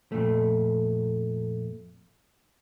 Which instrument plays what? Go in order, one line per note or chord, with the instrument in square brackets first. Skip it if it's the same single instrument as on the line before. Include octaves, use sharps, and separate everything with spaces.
[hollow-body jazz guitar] F2 A#2 A3